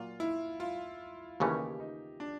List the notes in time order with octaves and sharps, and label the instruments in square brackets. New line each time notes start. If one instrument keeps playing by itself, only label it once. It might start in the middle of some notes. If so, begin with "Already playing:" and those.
Already playing: [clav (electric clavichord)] A#2 F#3 [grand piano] F4
[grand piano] E4
F4
[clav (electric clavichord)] D#2 C#3 E3 A3 C#4 [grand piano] G4
[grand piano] D#4
D4